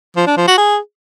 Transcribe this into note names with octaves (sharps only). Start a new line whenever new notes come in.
F3
D4
F3
F#4
G#4